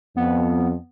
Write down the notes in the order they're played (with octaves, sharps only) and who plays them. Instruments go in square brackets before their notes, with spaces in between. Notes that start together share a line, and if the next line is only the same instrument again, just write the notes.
[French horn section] F2 [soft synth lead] B3